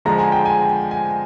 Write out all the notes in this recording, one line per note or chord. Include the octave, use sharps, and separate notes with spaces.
D3 F3 G#3 A#5
G#5
G5
G#5
G#5